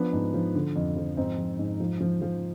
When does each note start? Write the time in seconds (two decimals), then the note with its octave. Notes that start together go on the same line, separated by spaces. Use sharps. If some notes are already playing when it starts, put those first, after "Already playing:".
Already playing: F3 B3 D4
0.13 G#2
0.34 F3
0.55 D3
0.76 F2
0.96 F3
1.17 G#2 C4 D#4
1.38 F3
1.59 G#2
1.80 F3
2.01 F3
2.22 F3